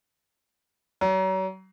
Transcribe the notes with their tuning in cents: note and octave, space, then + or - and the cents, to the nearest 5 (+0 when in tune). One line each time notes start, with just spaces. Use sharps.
F#3 +35